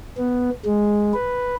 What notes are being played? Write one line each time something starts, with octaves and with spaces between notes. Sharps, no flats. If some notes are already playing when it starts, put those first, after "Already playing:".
B3
G#3
B4